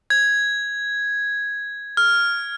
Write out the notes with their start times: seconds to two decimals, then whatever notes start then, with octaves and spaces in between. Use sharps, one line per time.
0.10 G#6
1.97 F6